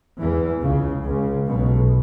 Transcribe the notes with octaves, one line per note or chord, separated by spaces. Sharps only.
E2 E3
C#2 C#3
C#2 C#3
B1 B2